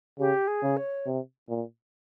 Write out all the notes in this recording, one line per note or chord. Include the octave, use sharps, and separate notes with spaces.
C#3 G4
G#4
C#3
C#5
C3
A#2